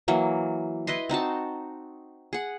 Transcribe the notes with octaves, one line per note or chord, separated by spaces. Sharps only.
E3 F#3 A#3
E4 B4 D#5 C6
C4 D#4 F#4 A5
G#4 F#5